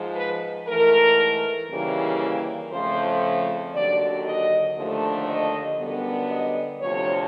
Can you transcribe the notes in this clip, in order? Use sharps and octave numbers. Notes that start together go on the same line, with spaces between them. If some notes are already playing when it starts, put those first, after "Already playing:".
Already playing: G#2 F3 G#3
B4
G#2 E3 A3 A#4
D#2 C#3 E3 G3 A#3
F2 C#3 F3 A3 C5
D#2 D3 F#3 D5
D#5
D#2 D3 F3 A3
D#5
F#2 D3 G3 B3
D#5
D2 C3 F3 C#5